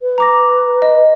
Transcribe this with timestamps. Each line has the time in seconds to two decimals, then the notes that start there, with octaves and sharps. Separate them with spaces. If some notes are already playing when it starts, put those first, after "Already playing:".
0.01 B4
0.18 A#5 D6 A#6
0.82 D#5